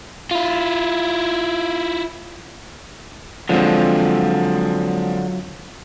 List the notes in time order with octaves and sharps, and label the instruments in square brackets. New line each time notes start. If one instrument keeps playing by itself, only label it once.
[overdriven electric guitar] E4 F4
[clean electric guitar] D3 [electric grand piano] F3 G#3 C4 [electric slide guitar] F#3 F4